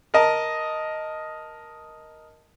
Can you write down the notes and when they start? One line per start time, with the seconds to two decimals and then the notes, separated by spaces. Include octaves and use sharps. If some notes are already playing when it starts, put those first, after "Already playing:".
0.14 A#4 D#5 A5